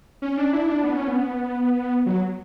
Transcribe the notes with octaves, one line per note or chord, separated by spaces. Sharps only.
C#4
D4
E4
D4
B3
C#4
B3
F#3